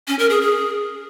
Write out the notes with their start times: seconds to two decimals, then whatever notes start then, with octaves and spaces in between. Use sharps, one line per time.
0.08 C#4
0.19 A#4
0.30 G#4
0.41 G#4